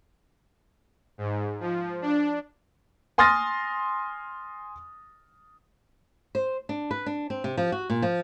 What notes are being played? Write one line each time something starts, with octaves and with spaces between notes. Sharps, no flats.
G#2
F3
D4
G#5 C6 D#6 F6 A6 A#6
C5
D4
B4
D4
C4
C3
F3
F#4
A#2
F3